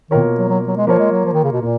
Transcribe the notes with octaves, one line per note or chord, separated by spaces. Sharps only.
B2 D#3 A#3 F4 A#4 C#5
F#3
F#3
F#3
G#3
F3 A#3 F4 A#4 C#5
G#3
F#3
F3
D#3
C#3
B2
A#2 A#3